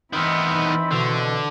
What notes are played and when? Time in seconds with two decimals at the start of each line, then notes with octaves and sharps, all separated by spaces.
0.13 D#3 E3 B3 C4 D#4 B5
0.91 B2 D3